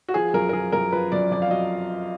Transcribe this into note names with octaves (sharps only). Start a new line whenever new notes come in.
F#4
F3 G#4
F#2 A#4
A#4
F3 G#4
F#2 A#4
F3 B4
F#2 D5
F2 D5
F5
F#3 D#5